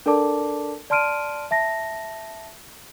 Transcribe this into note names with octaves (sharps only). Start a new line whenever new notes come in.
D4 A4 A#4 D5 A5 D6
D5 A5 C6 F6 D7 D#7
E5 A5 A#6